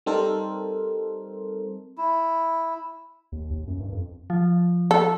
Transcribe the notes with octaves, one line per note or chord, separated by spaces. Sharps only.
G3 C4 D#4 A4 A#4 C5
E4
D#2
D#2
F#2
G2
F2
F3
A4